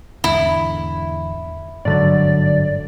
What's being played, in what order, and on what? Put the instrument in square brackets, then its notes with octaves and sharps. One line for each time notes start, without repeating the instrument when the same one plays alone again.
[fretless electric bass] E2 G#2 D3 [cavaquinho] E4
[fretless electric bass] G1 [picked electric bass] G#2 D3 F#3 [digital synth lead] D5